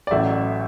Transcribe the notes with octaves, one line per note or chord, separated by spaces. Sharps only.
D5
A1 A2 F#3 E5